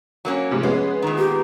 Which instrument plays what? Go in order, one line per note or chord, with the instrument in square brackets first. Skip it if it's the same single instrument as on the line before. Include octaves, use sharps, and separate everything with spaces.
[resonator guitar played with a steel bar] F#3 A#3 C#4
[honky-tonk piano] G#2 C3 F3
[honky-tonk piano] G#3 B3 [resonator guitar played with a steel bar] C#4
[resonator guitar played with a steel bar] A#2 D#3
[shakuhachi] G4